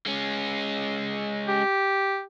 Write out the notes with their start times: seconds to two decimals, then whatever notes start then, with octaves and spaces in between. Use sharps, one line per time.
0.06 G#3 C#4
1.48 G4